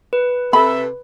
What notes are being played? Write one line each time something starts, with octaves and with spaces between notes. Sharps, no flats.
B4
C3 A4 E5 B5